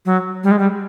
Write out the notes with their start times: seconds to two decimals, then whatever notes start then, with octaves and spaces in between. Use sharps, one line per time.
0.06 F#3
0.44 G3
0.51 G#3
0.59 G3